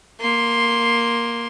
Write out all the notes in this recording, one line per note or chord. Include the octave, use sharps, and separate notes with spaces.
A#3 C6